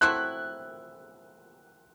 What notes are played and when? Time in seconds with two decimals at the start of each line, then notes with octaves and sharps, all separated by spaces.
0.01 F#3 A3 C4 E4 F#6